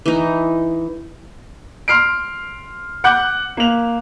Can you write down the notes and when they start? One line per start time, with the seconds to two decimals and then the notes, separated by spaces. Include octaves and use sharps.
0.06 E3 D#4
1.88 C6 F6 C7 D7
3.04 F#5 D6 F#6 G6
3.57 A#3 F7